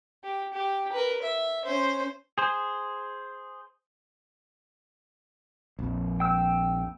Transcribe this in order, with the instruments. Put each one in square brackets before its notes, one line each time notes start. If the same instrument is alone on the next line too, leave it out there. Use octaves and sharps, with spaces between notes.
[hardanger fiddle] G4
G4
A#4 B4
E5
C#4 C5
[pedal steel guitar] G#4 C5
[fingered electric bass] A#1 F2
[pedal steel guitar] G5 E6